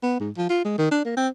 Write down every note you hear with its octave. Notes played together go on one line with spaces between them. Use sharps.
B3
G#2
F3
F4
G#3
D#3
D4
A#3
C4